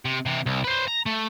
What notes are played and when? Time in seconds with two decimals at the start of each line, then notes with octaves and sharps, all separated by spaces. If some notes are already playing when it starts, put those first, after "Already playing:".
0.05 C3
0.26 C3 E3
0.46 C2
0.64 B4 C5
0.88 A#5
1.06 A3